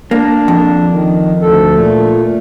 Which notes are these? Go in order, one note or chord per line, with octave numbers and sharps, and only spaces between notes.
A#3 D4
F2
D#3
D2 A4
A#2 A3